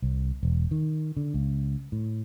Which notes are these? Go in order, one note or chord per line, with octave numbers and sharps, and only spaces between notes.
C2
E1
D#3
D3
C#2
A2